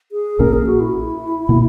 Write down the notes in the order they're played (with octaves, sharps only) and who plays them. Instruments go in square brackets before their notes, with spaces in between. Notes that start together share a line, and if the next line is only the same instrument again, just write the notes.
[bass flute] G#4
[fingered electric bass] A#1 A#2 A#3 C#4 [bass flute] A#4
[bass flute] G#4
F#4
E4
[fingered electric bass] B2 A#3